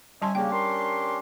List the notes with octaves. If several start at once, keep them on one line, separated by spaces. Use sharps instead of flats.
G3 C#4 E5 G#5 A5 C6
C#3 A#3 C#4 D4 G4 G5
A#4 C6